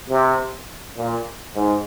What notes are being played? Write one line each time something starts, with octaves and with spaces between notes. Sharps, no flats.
C3
A#2
G#2